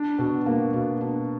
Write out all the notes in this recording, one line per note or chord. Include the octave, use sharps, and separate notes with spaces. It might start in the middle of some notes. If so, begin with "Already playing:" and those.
Already playing: D4
B2
A#3
B2
D4